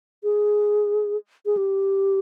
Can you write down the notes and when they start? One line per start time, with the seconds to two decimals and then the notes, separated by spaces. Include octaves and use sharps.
0.24 G#4
1.46 G#4
1.57 G4